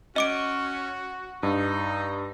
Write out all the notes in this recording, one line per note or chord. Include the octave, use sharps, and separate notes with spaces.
C#4 F#4 D#5 D6 D7
G2 D#4